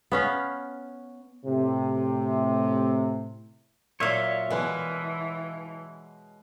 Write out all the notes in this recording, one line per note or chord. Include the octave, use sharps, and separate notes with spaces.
B3 C#4 F5
A2 C3
A#2 F#3 C#5 E5 F5
B2 E3 G#3 B4 G#5